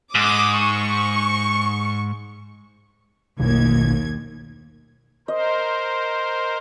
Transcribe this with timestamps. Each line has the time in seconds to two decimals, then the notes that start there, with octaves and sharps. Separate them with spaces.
0.15 G#2 D6 D#6
0.61 C#6
3.39 A#1 D#2 B2 D#3 G#6
5.28 A#4 C5 D#5